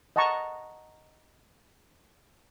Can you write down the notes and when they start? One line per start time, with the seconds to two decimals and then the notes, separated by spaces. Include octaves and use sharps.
0.16 D#5 F#5 A5 A#5 C#6